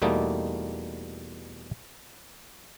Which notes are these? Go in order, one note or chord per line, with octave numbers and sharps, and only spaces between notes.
E2 B2 G3 A3 A#3 D#4